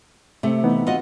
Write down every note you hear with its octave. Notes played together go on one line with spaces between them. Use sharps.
C3 A3
E3 B3 D#4
F4 F#4 D#5